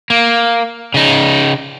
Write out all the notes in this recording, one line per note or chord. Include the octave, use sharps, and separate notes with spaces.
A#3
C#3 D#4